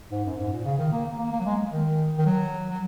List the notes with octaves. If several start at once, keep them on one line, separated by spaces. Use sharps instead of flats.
G#2
F#2
G#2
A#2
C#3
D#3
A#3
A#3
A#3
F#3
G#3
D#3
D#3
F#3
F#3